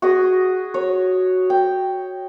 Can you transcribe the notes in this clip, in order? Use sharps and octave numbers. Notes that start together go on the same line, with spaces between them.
F#4 G#4 D#5
C#5
G5